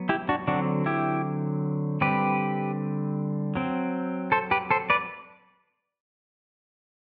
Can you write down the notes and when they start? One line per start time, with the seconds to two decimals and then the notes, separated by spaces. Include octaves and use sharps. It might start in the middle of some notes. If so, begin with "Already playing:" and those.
Already playing: F#3 B3
0.09 E4 G4
0.29 D4 F#4
0.48 D3 F#3 C4 D4 F#4
0.86 E4 G4
2.01 D3 G3 C4 G4 B4
3.55 F#3 C4
4.32 A4 C5
4.51 G4 B4
4.71 A4 C5
4.90 B4 D5